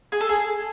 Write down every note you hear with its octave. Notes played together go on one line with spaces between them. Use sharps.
G#4
A4
G#4